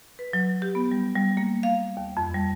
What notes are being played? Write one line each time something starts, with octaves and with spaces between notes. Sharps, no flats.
B4
F#3
G4
B3
G3
G3
A#3
F5
D#2
F2
G3